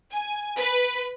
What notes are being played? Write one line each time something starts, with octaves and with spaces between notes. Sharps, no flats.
G#5
B4